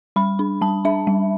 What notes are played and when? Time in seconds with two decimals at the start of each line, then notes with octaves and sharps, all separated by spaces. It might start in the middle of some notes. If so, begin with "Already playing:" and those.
0.16 G3 B5
0.39 D4
0.61 G3 A5
0.85 D4 E5
1.07 G3